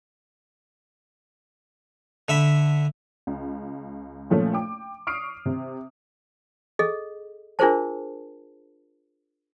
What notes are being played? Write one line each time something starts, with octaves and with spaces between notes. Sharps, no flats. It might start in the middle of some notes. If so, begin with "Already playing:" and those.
D3 E5 B5
C#2
A#2 F3 A3 C#4
G5 D6
C#6 D#6 F6 C7 D7
C3
G#4 A4 D#5
D4 F4 G#4 A#4 C5 A5